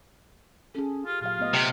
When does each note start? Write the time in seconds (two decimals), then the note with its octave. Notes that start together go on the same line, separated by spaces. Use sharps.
0.75 C#4 G#4 A4
1.06 F4 G4
1.21 A#2 F#3 F4 F5
1.38 A3 B3 D#5
1.54 C3